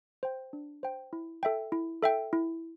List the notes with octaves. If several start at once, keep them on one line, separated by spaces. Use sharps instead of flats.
C5 G5
D4
C5 G5
E4
A4 E5 G5
E4
A4 E5 G5
E4